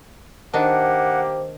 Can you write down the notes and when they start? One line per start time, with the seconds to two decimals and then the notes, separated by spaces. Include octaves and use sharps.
0.54 D#3 A#3 D4 G4 C5 F#5